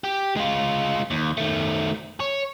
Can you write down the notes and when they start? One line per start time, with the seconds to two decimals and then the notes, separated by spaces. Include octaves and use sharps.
0.04 G4
0.37 G#3 F4
1.11 D#2
1.37 D#3 A3
2.20 C#5